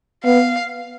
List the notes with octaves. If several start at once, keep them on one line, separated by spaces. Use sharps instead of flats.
B3 F5